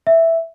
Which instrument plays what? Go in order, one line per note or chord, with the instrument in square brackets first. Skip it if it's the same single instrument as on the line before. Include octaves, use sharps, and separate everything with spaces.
[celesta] E5